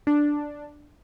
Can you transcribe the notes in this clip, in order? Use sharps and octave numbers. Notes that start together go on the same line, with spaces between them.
D4